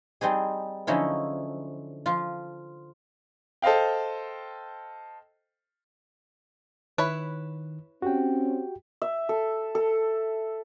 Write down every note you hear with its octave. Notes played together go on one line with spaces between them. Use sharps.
G3 C4 D#4 G#4
D3 F3 F#3 C#4 D#4 E4
F3 F4
A4 C5 D#5 F5 G5
D#3 E4 B4 C#5
C4 C#4 F#4 G4 G5
E5
A4
A4